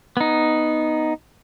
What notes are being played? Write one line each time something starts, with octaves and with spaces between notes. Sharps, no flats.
B3 D#4